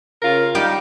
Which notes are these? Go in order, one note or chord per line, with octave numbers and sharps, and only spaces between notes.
C#3 F4 A#4
G3 D#4 G4 F5